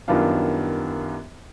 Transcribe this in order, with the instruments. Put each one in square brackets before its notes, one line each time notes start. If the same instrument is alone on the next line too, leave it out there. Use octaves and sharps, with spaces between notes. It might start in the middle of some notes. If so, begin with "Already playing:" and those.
[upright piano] F#2 D#3 G3 B3 D4 F4